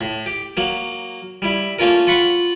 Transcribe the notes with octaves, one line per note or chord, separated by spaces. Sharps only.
A2
G4
F#3 A#3
G3 E4
A3 A#3 C#4 F4 A#4
F4 F#5 B5 C#6